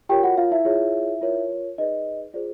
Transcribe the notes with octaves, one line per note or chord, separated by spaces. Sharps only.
F4 G4 A#4 C#5 G5
F#4 F#5
F4 F5
E4 E5
F4 G#4 C#5
F4 A#4 C#5
D#4 G#4 B4 D5 D#5
F4 G#4 C5 D5